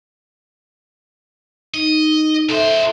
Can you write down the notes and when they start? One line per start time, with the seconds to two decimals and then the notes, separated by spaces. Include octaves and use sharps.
1.74 D#4 D#5
2.49 C#2 A4 C5 E5